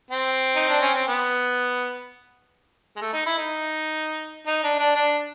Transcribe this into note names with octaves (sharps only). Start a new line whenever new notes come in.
C4
D#4
D4
C#4
C4
B3
G#3
A3
D#4
E4
D#4
D#4
D4
D4
D4